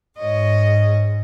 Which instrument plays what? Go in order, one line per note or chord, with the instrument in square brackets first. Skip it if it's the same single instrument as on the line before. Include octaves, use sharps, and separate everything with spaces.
[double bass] G#2 [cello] C#5 D#5